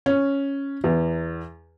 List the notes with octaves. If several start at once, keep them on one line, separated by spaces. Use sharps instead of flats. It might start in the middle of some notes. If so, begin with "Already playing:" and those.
C#4
E2